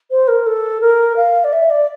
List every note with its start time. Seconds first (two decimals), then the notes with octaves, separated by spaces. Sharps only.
0.11 C5
0.28 A#4
0.46 A4
0.81 A#4
1.16 F5
1.44 D5
1.52 E5
1.70 D5